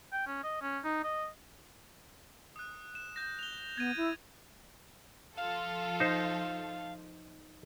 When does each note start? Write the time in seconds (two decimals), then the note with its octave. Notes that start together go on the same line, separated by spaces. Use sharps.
0.12 G5
0.27 C#4
0.44 D#5
0.62 C#4
0.84 D#4
1.04 D#5
2.56 D#6 F#6
2.95 E7
3.16 G6 A#6
3.39 F7 G7
3.78 B3 G#6 A6 D#7
3.97 E4
5.37 F3 F4 A4 F5
6.00 D#4 C5